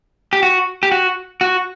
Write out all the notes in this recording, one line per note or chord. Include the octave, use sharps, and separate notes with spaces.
G4
F#4
G4
F#4
F#4